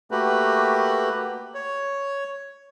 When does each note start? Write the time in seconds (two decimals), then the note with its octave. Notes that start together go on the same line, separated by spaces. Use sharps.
0.11 A3 A#3 F#4 G4 B4
1.54 C#5